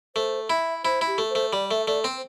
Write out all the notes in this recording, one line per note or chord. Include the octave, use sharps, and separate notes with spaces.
A3 C5
E4 E5
E4 C5
E4
G4
A3
C5
A3
G3 D5
A3 E5
A3 D5
C4 C5